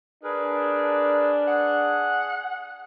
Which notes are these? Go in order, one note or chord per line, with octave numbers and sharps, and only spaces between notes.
D4 G#4 A#4 B4
G#4 F#5